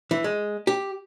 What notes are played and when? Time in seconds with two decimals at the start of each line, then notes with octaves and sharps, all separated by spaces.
0.11 E3
0.24 G#3
0.67 G4